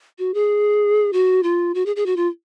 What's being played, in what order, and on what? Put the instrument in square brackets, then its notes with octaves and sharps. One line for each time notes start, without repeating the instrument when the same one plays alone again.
[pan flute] F#4
G#4
F#4
F4
F#4
G#4
G#4
F#4
F4